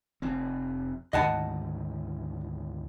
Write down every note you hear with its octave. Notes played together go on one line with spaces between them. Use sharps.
F1 F2 C4
D2 G#2 D#3 D#5 F#5 A5